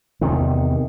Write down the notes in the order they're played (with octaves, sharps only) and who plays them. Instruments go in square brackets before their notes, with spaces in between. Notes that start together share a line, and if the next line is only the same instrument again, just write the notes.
[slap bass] E2 C3 D#3